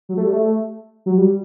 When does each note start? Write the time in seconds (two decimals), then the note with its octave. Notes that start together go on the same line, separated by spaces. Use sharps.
0.09 F#3
0.17 A3
0.25 G3
0.33 A3
1.06 F#3
1.18 G3